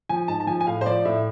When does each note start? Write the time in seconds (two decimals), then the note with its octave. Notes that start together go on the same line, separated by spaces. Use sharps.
0.09 F3 G#5
0.28 G#2 A5
0.40 A5
0.47 F3 G#5
0.61 G#5
0.67 A2 F5
0.81 C5
0.86 F3 D5
1.05 A2 E5